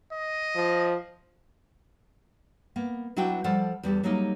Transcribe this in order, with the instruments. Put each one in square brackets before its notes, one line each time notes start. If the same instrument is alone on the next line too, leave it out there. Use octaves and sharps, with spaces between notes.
[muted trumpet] D#5
[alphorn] F3
[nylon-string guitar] A#3 B3
F#3 D4 E4 F#4 B4 G5
F3 G3 A4 D5 F#5
E2 G3 G4 A4
F#3 G3 A3 A#3 D#4